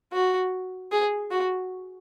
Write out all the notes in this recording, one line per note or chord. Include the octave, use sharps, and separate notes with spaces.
F#4
G#4
F#4